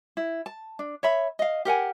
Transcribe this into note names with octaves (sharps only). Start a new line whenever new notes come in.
E4
A5
D4
C#5 E5 B5
D#5 F5
G4 A#4 F#5 G#5